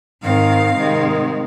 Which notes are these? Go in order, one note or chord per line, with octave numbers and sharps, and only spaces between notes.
G#2 D#3 C4 F5
C3 D#3 G#3